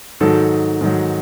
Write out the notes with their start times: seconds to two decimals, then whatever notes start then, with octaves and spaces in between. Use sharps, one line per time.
0.20 G#2 D#3 F#3 A4
0.81 G#2 D#3 F#3